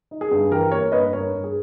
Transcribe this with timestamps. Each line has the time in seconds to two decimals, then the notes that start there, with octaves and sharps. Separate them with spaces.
0.11 D#4
0.21 G#4
0.31 G2
0.51 E3 G4 A#4
0.71 A#3 A#4 C#5
0.92 G2 B4 D#5
1.13 G2 A#4 C#5
1.33 G2
1.44 G#4